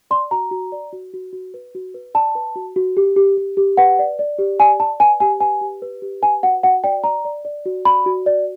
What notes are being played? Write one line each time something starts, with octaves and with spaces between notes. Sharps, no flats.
D5 C6
F#4 A#5
F#4
D5
F#4
F#4
F#4
B4
F#4
B4
D5 A5
B4
F#4
F#4
G4
G4
G4
G4
B4 F#5
D5
D5
G4
D5 G#5
D5 A5
B4 G#5
G4 G#5
B4 G#5
G4
B4
G4
B4 G#5
F#4 F#5
F#4 F#5
D5 G5
D5 A#5
D5
D5
F#4
D5 B5
F#4
D5